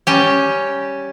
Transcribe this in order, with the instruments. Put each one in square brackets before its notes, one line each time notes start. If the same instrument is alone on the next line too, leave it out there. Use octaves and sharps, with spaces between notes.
[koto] G3 C#4 G4